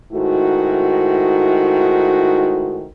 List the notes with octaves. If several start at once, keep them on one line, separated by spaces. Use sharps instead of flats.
G#2 D#3 A3 E4 F#4